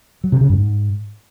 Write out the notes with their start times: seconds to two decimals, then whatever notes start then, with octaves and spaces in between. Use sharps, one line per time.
0.24 F#3
0.32 C3
0.41 C#3
0.49 G2
0.58 G#2